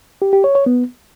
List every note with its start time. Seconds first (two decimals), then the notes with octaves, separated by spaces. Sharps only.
0.22 G4
0.33 G4
0.44 C#5
0.55 C#5
0.66 B3